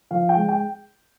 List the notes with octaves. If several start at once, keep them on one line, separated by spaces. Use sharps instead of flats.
F3 F5
G5
G#3
G5